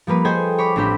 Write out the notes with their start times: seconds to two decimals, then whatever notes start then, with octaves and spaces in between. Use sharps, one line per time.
0.07 F3 G3 A#3 B4
0.25 G#4 A4 C5 D#5 G5 G#5
0.58 C#5 B5 D6
0.76 A1 C4 D4 G4 B5